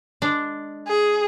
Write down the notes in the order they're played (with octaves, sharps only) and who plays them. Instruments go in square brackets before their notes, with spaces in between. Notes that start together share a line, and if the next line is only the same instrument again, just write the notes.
[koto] G#3 D4
[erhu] G#4